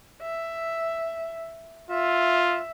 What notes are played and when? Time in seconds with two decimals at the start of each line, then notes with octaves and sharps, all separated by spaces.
0.22 E5
1.91 F4 E5